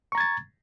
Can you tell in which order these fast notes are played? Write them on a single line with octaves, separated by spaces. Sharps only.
C#6 A#5 G#6 A6